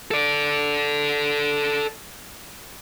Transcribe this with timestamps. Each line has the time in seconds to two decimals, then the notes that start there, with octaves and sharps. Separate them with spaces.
0.11 A4 D5